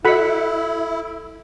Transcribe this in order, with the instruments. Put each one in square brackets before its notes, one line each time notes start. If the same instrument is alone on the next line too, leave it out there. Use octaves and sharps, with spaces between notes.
[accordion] E4 [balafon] F#4 D#5 [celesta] A4 [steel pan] F#5 B5